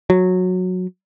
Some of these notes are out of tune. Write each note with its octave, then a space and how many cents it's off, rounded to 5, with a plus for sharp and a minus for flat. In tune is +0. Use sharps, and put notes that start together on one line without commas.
F#3 -15